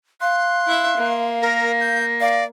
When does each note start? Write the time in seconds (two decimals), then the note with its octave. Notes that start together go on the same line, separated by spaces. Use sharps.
0.21 F5 C6 F#6
0.67 E4 E5
0.97 A#3
1.42 A#4 A#6
1.81 G6
2.20 D5 F5